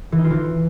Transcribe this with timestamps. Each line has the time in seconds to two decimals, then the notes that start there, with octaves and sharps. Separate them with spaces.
0.12 E3
0.18 D#4
0.24 F4
0.30 E3